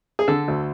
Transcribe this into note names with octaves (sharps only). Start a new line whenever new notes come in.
G#4
D3 A4
D2